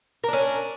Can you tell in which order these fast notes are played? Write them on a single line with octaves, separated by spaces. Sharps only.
A#4 D4 C#4